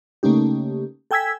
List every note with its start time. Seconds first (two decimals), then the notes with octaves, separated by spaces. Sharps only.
0.23 C#3 A3 A#3 C#4 D#4 G4
1.11 A4 G5 G#5 E6 G#6 B6